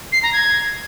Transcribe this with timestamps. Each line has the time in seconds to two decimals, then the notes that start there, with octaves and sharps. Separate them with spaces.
0.12 C7
0.23 A#5
0.33 G#6